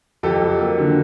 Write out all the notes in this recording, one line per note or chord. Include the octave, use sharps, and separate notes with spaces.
F2 G4 A4
F#3
A#3
D3